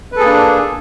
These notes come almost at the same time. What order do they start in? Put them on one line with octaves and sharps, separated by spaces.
B4 A4 G#4 A#3 D4